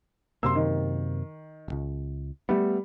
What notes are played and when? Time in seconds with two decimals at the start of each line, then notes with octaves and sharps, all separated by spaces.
0.43 F#2 C3 A#3 C6 E6
0.55 D#3
1.68 D#1 C#2
2.49 G3 A3 B3